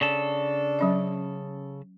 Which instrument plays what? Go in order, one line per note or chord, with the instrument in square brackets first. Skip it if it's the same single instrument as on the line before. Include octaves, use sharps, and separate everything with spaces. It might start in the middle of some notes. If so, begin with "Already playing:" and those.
[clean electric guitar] C#3 A4 [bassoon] D4
[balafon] F#3 C#4 D#5